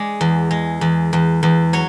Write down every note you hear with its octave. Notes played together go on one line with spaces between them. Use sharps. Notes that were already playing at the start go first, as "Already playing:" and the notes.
Already playing: G#3 D5
E2
G#3
E2
E2
E2
F#3 C#5